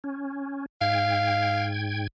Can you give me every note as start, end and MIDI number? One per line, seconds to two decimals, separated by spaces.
0.04 0.66 61
0.81 2.07 44
0.81 1.69 77
0.81 2.07 79
0.81 2.07 92